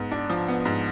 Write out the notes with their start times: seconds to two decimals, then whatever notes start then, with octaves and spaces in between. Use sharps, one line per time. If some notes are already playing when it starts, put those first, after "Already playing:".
Already playing: G#2 B3
0.12 D4
0.30 F3
0.48 B3
0.65 G#2